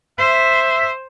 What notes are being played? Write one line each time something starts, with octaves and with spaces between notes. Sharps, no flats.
C5 E5